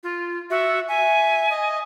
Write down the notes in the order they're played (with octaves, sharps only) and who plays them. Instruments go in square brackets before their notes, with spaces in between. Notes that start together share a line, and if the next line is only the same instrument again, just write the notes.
[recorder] F4
[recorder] F#4 [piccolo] E5
[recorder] E5 [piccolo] G#5
[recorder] D#5